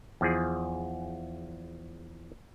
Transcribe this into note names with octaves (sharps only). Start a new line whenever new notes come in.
E2 F3 G#4